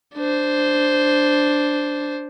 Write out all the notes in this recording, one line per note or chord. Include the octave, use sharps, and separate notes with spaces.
D4 C5